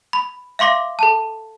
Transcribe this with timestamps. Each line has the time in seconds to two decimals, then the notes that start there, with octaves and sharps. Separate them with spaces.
0.13 B5
0.59 E5 F5 C6 D6 A#6
0.99 A4 A5